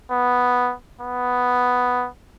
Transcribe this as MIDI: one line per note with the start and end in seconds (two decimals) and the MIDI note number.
0.12 0.73 59
1.02 2.08 59